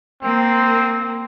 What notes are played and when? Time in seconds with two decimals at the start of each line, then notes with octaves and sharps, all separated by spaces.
0.23 A#3 C4